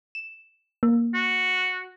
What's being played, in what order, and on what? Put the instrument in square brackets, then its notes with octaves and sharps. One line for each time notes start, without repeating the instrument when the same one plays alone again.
[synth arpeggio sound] E7
A#3
[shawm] F#4